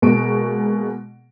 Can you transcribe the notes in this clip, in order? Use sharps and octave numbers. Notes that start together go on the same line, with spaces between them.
B2 G#3 A#3 C#6 D7